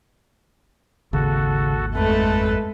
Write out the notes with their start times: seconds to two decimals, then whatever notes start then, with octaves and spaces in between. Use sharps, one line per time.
1.13 G#1 D#2 C#3 F#4 A4
1.95 F2 G#3 A3 A4 B4